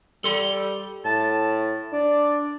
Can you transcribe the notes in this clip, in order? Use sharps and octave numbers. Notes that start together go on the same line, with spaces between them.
G3 A4 C6
A2 A5
D4 D5